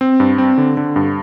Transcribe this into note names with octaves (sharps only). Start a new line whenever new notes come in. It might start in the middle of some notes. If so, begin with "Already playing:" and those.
C4
G2
C4
D3
D3
G2